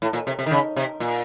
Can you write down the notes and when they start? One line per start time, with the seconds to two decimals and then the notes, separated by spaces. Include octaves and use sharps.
0.02 A2
0.13 A#2
0.27 C3
0.39 C3
0.46 D#3
0.51 C#3
0.76 C3
1.00 A#2